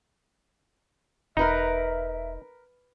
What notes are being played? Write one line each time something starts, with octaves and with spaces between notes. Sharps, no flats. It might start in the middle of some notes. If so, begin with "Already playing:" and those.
E1 D#4 A#4 B4 E5 A#5